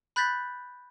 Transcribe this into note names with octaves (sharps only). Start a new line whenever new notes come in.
B5 F#6 G6 A6 B6